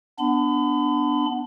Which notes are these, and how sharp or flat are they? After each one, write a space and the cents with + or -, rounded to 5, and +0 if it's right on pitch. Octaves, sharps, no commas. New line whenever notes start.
B3 +0 D4 +0 B5 +40